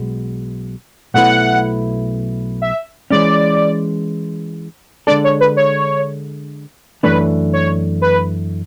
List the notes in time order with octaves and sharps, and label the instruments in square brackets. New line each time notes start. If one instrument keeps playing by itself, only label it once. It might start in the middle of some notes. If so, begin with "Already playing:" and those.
Already playing: [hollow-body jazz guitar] B1 B2 G#3
[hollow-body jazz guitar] B1 B2 A3 E4 B4 [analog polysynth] F#5
[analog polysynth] E5
[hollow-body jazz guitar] E3 G#3 C#4 [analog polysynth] D5
[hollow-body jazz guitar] D3 G#3 D4 A4 [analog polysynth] D5
[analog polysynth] C#5
B4
C#5
[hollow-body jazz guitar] F#2 E3 A3 D4 [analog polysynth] B4
[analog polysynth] C#5
B4